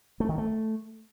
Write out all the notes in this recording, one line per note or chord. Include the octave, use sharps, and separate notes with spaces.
A3
D#3
A3